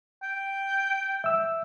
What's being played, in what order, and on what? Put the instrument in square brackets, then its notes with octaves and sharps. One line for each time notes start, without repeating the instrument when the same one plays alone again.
[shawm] G5
[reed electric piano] E5 E6